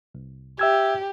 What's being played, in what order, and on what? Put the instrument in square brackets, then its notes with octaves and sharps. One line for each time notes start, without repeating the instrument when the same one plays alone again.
[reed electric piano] C2
[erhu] G4 [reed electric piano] E5 E6 G#6